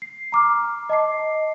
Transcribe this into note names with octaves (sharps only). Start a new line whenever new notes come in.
C7
A#5 D6 F6
D#5 A5 D6 C7